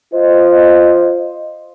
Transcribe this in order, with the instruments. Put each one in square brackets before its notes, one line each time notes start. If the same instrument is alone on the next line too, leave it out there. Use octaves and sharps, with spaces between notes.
[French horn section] F4 C5 D#5